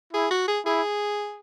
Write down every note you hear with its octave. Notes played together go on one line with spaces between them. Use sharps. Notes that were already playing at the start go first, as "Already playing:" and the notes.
E4 G#4
F#4
G#4
E4 G#4